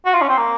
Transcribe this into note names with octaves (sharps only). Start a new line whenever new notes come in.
F#4
F4
C#4
C4
A#3